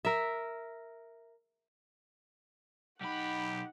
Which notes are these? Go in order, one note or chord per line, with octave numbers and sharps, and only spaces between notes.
A#4 E5
B1 D#4 G4 F#5 B5